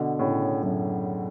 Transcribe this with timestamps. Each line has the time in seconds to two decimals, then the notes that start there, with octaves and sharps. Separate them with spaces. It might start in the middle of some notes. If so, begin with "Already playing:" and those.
Already playing: B2 D3
0.19 A2 C#3
0.63 F#2 A2